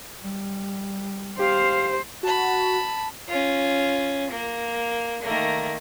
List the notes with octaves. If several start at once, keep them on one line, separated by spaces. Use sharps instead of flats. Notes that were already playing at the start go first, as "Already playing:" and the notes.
G3
G4 C5 F5
F#4 A5 B5
C#4 F4
A#3
D#3 A3 A#3